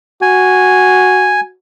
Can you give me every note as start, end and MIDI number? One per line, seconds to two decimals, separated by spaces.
0.22 1.54 66
0.22 1.41 80